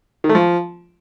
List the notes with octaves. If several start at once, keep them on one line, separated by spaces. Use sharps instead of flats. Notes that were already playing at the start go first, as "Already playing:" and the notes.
D#3
A3
F3